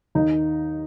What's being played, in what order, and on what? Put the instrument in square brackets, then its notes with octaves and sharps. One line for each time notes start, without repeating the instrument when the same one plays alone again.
[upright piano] D#2 D#3 D#4